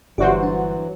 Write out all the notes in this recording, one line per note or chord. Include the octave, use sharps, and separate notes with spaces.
G1 E3 F#3 F#4 G4 C5 D5 E5
D4